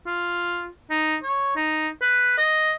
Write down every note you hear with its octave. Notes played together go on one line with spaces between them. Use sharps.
F4
D#4
C#5
D#4
B4
D#5